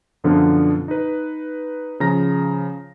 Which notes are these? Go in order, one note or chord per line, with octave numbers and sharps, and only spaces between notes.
F#2 B2 D3 F3 D4 F4
D#4 B4
C#3 F3 A#5 A#6